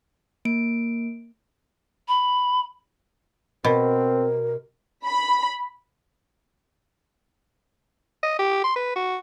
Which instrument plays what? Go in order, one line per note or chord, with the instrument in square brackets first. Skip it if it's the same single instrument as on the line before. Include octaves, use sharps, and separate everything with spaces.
[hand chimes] A#3 D7
[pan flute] B5
[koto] B2 [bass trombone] C4 [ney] A#4
[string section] B5
[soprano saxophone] D#5
G4
C6
B4
F#4